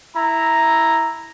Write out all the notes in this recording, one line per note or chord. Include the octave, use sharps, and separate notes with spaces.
E4 A#5